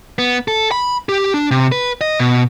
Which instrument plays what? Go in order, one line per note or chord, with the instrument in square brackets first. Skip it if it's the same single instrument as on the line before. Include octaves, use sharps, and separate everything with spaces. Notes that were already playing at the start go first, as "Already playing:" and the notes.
[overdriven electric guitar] B3
A4
B5
G4
D4
C3
B4
D#5
B2